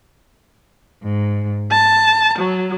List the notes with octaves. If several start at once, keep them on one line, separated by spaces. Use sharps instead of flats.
G#2
A5
F#3